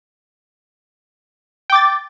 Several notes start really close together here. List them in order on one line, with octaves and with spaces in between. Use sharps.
G5 D6 A6